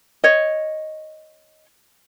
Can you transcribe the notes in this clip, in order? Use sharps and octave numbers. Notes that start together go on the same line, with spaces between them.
C#5 D#5